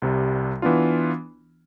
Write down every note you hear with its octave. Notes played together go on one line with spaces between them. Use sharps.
C2 C3 G3
E3 B3 D4 F4